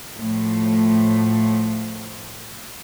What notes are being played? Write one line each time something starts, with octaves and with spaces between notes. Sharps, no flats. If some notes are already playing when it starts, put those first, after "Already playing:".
A2 F3 A3